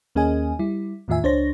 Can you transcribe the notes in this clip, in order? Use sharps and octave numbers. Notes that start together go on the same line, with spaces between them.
D#2 A#3 C#4 G#4 D#5 G#5
G3 E4
E2 A2 D#3 F4 E5 G#5
C#2 D4 C5 C#5 A#6